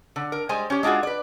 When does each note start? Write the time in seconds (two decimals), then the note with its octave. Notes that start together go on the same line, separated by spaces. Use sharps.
0.16 D3
0.32 A#4
0.49 G3 G#3 C5 G#5
0.70 C#4 G4
0.83 G#3 D4 F4 F#4 G#4
1.03 B4 D5